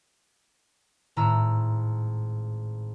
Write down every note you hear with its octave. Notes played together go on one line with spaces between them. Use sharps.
G#1 A2 A#5 E6